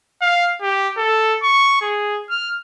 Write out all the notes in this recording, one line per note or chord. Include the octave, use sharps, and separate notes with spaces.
F5
G4
A4
C#6
G#4
F6